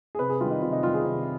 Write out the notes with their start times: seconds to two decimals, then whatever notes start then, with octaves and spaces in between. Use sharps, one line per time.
0.15 G#4
0.19 C3 B4
0.30 G#4
0.41 D#3 G3 F4
0.51 D#4
0.62 C3 F4
0.72 D#4
0.83 D#3 G3 F4
0.94 G#4
1.05 C3